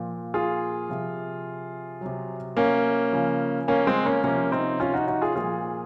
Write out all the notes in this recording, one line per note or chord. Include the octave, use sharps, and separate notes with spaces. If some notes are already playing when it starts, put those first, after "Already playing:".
Already playing: A#2 F3
F4 G#4
C3 F3
C3 F#3
A#3 C#4
C#3 F3
A#3 C#4
G#3 C4
A#3 C#4
C3 F3 A#3 C#4
C4 D#4
C#4 F4
D#4 F#4
D#4 F#4
F4 G#4
A#2 F3 F4 G#4